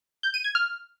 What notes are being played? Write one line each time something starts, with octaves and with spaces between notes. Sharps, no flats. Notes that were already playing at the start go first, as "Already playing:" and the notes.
G6
D#7
G#6
F6